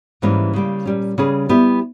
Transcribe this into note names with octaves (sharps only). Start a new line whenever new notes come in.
G#2 E3 G3 A#3 C#4
C#3 G3 A#3
A#2 G3 C#4
C#3 G3 C#4 G#4 B4
G3 B3 E4 G4